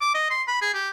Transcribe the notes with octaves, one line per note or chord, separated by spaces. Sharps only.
D6
D#5
C6
B5
G#4
G4